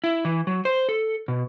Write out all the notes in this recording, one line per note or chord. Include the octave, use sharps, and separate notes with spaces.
E4
E3
F#3
C5
A4
B2